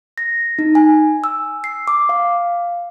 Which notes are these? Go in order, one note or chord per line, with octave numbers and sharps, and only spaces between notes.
A#6
D#4
G#5
E6
C7
D6
F5